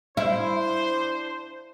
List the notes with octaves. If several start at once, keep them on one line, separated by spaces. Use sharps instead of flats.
D4 E4 C5